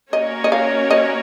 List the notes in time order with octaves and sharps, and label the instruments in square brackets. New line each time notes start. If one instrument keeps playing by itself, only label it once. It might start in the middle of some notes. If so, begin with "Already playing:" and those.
[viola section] A#3 C#4 F#4 A#4 C#5 [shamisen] D#5
[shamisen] D#5
F5
D#5